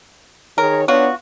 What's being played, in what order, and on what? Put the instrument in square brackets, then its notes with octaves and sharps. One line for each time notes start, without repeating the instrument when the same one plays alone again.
[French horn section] D#3 G#4 C#5 [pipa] A#4
[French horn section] B3 D4 C#5 [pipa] F4 F#4